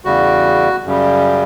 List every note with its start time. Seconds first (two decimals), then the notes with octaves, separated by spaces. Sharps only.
0.05 E2 C#3 G3 F#4
0.85 F#2 C#3 G3